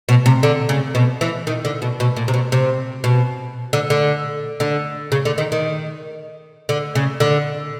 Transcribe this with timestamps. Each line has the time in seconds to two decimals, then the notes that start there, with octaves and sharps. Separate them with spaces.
0.09 B2
0.26 C3
0.43 D3
0.69 C#3
0.95 B2
1.21 E3
1.47 D#3
1.65 D3
1.82 B2
2.00 B2
2.17 A#2
2.28 C3
2.34 B2
2.52 C3
3.04 B2
3.73 D3
3.90 D3
4.60 D3
5.12 C#3
5.25 D3
5.38 D#3
5.52 D#3
6.69 D3
6.95 C#3
7.20 D3